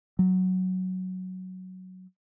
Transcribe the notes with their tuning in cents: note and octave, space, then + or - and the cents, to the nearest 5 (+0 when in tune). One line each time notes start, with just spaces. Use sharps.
F#3 +5